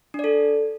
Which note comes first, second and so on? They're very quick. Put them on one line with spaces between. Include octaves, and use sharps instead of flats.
D4 D5 A4